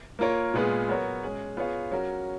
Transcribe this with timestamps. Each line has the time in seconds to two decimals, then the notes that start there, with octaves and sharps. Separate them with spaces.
0.19 A#3 F4 A#4 C#5
0.54 A#2 G#3 B3 F4 G#4
0.88 F#3 B3 F#4 A#4 C#5
1.23 G#3 C#4 G#4
1.57 B3 F4 G#4 C#5 F5
1.91 F#3 C#4 F#4 A#4